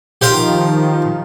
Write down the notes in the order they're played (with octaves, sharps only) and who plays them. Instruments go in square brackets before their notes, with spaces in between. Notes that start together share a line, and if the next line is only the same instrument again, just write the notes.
[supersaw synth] D#3 F3 [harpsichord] G4 C5 F5